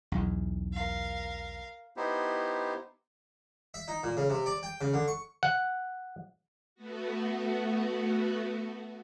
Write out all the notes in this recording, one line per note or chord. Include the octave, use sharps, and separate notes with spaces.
B1 E2
A#4 F5
B3 D#4 E4 G4 C5
E5
D#4
A#2
C#3
C3
D5
G5
C#3
D3
C#6
F#5
A3 B3 F#4